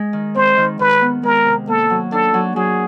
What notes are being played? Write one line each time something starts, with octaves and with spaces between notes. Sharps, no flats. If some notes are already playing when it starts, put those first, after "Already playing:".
Already playing: G#3
D#3
C4 C5
D#3
D#3 B4
B3
G#3 A#4
C3
A#3 A4
F#3
D4 A4
F#3
F#3 G#4